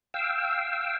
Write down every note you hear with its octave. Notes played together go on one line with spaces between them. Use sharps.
F5 G5 E6